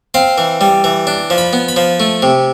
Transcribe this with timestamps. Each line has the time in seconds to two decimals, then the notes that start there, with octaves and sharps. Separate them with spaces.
0.14 C4 F5
0.38 E3
0.61 G3
0.84 E3
1.07 D4
1.30 F3
1.38 B5
1.53 B3
1.68 B5
1.76 F3
2.00 A3
2.22 C3